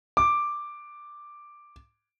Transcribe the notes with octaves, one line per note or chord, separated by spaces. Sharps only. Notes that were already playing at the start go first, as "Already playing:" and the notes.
D6